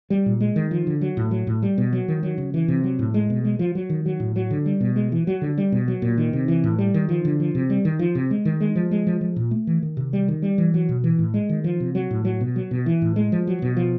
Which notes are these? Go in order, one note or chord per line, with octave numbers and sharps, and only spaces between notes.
G3
A#2
G#3
D#3
F3
D3
F#3
A2
F#3
A2
G3
B2
F#3
D#3
F#3
C#3
E3
C3
F#3
A2
G#3
B2
G#3
F3
F#3
D#3
F#3
A2
F#3
D3
G3
B2
G#3
E3
F#3
D3
G3
B2
F#3
A#2
D#3
C3
E3
A2
G3
D#3
F3
D3
F3
C3
G3
D#3
F3
C3
G#3
D#3
G#3
F3
G#3
F3
F3
A#2
A3
E3
D#3
C3
G3
D#3
G3
E3
F#3
B2
E3
A2
G#3
D#3
F3
C3
F#3
A2
F#3
B2
F#3
B2
E3
A2
G#3
F3
F#3
B2
F3